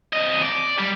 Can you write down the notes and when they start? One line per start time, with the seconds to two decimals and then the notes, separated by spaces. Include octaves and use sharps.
0.13 C2 D#5
0.42 D5
0.79 G3